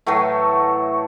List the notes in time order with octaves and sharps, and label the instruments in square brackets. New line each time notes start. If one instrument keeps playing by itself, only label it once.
[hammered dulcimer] A2 E3 F#3 A3